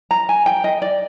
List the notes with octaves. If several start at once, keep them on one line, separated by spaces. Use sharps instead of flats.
A#5
G#5
G5
D#5
D5